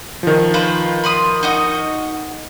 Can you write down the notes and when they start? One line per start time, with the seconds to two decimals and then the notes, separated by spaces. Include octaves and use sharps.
0.23 D#3 F3
0.54 F4 B4 C5
1.04 B5 C6 D#6
1.43 D#4 F#4 D#5